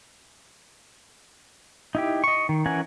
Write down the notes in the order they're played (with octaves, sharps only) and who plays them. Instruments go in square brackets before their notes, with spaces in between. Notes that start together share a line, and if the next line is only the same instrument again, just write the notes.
[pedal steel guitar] D#4 E4 G4
D#5 C#6
D#3
E3 C#4 A#4 F#5 G#5